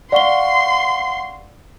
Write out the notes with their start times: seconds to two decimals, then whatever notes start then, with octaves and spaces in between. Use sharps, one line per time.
0.12 D5 F5 F#5 C6 C#6 G7